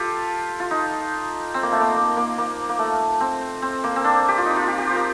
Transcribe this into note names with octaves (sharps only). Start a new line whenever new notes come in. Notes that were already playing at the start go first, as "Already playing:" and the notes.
Already playing: F4 G4 A4
F4
D#4
C4
A#3
A3
A#3
A#3
A#3
A#3
A#3
A3
C4
C4
A#3
C4
D4
G4
F4
D#4
F4
G4
G4
C5
A#4